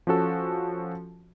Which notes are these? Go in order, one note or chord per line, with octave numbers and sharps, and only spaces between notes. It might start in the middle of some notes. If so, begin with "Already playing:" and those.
F3 C#4 F#4 A4